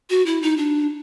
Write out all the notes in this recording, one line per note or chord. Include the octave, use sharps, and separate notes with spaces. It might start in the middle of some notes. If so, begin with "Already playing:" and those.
F#4
E4
D#4
D4